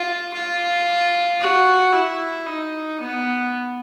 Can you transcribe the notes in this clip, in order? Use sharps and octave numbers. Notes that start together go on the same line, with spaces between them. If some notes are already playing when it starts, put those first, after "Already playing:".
Already playing: F4
F4
F#4
E4
D#4
B3